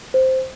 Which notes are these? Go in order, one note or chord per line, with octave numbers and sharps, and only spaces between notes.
C5